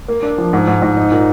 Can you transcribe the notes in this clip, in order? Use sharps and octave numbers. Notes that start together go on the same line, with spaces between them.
A#3
D4
F3
G#2
G#2
G#2
D#4
A#2